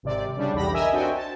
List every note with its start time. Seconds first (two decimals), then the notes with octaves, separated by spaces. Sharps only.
0.03 G#1 C3 D5
0.37 C#3 G3 D4
0.53 B1 E2 G4 B5 A#6
0.73 A#4 D#5 E5 G#5 E6
0.92 C4 D4 F#4 A4 G5 G#5
1.17 A5